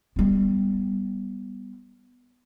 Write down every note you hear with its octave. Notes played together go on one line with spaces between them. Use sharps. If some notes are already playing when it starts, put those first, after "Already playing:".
G3 B3